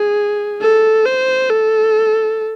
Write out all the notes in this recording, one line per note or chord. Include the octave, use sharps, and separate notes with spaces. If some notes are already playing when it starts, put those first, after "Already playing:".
Already playing: G#4
A4
C5
A4